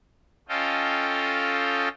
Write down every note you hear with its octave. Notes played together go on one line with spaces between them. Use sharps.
C#4 F4 A4 D#5 F5 G5